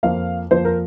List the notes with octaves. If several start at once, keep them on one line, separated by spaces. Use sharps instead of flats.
F2 F3 A#3 F5
F2 F3 A#3 C5
A#4